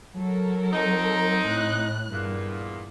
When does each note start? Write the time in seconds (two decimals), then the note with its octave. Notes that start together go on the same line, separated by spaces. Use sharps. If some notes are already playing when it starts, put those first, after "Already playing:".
0.14 F#3 A4 A#4
0.73 C4 D#4
1.47 A2 F#6
2.11 E2 G2 A#2